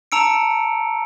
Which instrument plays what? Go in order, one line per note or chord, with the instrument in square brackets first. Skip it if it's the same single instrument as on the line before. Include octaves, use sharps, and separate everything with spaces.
[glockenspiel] A5 A#5 E6 C#7 D7